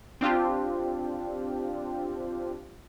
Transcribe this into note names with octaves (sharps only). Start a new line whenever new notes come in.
C4 D4 F4 G4